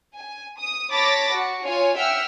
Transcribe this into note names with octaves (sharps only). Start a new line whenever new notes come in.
G#5
D#6
C#5 A5 B5 D6 A6 A#6
F#4
F4 C#5 G#5
E5 F#5 G5 E6 F6